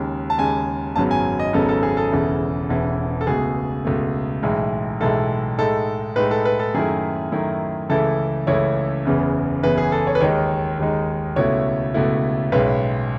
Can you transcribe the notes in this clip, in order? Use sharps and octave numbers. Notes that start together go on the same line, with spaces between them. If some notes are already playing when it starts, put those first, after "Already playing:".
Already playing: D#2 C#3 G#3
A5
D#2 C#3 G#3 G#5
G#1 F#2 C#3 F#3 B3 A5
G#5
D#5
G#1 F#2 C#3 F#3 B3 A4
A4
G#4
A4
E1 E2 C#3 E3
E1 E2 C#3 E3
A4
C#2 B2 A3 G#4
C#2 B2 A3
B1 A2 E3 G#3
B1 A2 E3 G#3 A4
A2 G#3 D#4 A4
A2 G#3 D#4 B4
A4
B4
A4
F#2 D#3 A3 E4 G#4
F#2 D#3 A3 E4
C#2 C#3 E3 A3 E4 A4
C#2 C#3 E3 A3 E4 C#5
F#1 E2 C#3 E3 B3
F#1 E2 C#3 E3 B3 B4
G#4
A4
C#5
B4
D#2 D#3 G#3 D#4 C#5
D#2 D#3 G#3 D#4
C#2 B2 A3 E4 C#5
C#2 B2 A3 E4
B1 A2 G#3 C#4 B4